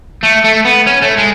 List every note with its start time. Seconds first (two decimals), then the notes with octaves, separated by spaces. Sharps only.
0.23 A3
0.44 A3
0.65 B3
0.87 C#4
1.02 A3
1.18 G#3